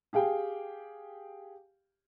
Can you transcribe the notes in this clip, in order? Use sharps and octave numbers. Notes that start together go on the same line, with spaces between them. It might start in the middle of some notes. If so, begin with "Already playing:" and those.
G4 G#4 F5 G5